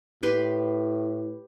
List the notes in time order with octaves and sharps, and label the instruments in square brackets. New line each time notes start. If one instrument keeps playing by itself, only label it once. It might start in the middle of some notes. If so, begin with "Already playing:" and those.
[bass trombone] A2 [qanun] G4 B4 C6